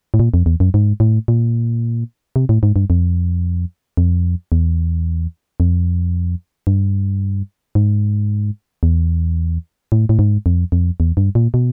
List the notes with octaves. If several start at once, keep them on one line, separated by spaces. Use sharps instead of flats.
A2
A#2
F2
E2
F#2
G#2
A2
A#2
C3
A2
G#2
G2
F2
F2
E2
F2
G2
G#2
E2
A2
A2
G#2
F2
F2
E2
G2
A#2
B2